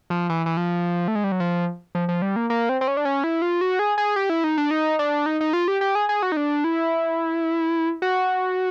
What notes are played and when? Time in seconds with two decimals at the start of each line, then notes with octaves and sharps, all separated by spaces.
0.10 F3
0.29 E3
0.46 E3
0.57 F3
1.08 A3
1.15 G#3
1.24 G3
1.32 F#3
1.40 F3
1.95 F3
2.09 F3
2.22 G3
2.36 A#3
2.50 A#3
2.69 C4
2.81 C4
2.88 C#4
2.97 D4
3.05 C#4
3.24 E4
3.42 F4
3.61 F#4
3.79 G#4
3.98 G#4
4.16 G4
4.30 E4
4.44 D#4
4.58 D4
4.71 D#4
4.99 D4
5.26 D#4
5.41 D#4
5.53 F4
5.68 G4
5.81 G4
5.95 G#4
6.09 G#4
6.23 F#4
6.32 D#4
6.37 D4
6.64 E4
8.02 F#4